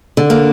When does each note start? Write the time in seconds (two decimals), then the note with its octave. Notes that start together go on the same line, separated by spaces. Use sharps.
0.17 D3
0.30 A#3 D4